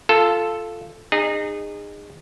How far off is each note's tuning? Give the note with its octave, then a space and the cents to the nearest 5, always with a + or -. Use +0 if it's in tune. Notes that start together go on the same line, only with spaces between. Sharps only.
F4 -5 A4 +0
D#4 -30 G#4 -25